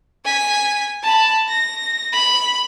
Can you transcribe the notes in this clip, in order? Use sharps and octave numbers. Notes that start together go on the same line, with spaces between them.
G#5 B6
A5 B5
A#6
B5